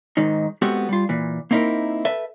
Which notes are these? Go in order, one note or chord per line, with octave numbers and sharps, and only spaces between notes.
G#2 D#3 D#4
G#3 B3 C4 F#4 G4 A4
G3 F4
A#2 E3
A#3 C4 D#4 E4 A#4
A4 B4 E5